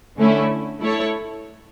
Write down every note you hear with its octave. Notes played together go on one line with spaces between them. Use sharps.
D3 A3 C#4 E4
A3 E4 A4 C#5